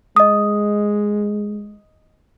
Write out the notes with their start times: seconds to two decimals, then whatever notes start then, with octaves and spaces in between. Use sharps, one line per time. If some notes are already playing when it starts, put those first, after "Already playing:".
0.16 G#3 D#5 D#6